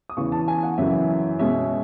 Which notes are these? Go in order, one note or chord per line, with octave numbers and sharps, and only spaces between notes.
D#6
E2 C#3 E3 C#6
A5
G#5
F#5
F#2 C#3 E3 E5
B2 G#3 C#4 E5